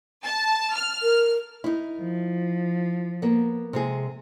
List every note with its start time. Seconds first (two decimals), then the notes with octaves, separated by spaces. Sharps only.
0.24 A5
0.74 F6
1.03 A#4
1.64 D#4 E4
2.02 F3
3.22 A#3 B3
3.73 C3 G#3 G#4